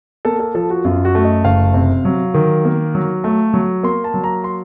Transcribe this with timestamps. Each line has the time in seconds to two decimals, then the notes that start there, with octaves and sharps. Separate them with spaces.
0.25 A#3 A4
0.40 A4
0.55 F3 A4
0.70 F#4
0.85 F#2 F4
1.05 F#4
1.15 A3
1.24 D#5
1.44 F#1 F5
1.74 C3
2.05 F#3
2.34 D#3
2.65 A#3
2.95 F#3
3.24 A3
3.54 F#3
3.83 A#3 C6
4.04 A5
4.14 F#3
4.24 A#5
4.44 C6